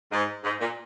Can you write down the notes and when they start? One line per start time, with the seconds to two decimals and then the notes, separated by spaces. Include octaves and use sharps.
0.12 G#2
0.44 G#2
0.60 A#2